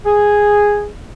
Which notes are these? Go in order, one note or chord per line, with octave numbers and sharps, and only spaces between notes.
G#4